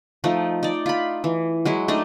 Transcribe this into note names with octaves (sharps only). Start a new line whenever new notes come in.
F3 A3 D#4
D#4 D5
F4 B5
E3
F#3 G#3 E4
A3 D4 D#4 D#5